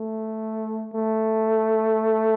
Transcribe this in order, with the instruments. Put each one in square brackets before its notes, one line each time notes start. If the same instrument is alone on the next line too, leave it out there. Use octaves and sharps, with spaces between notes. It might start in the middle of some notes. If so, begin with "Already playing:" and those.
Already playing: [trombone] A3
A3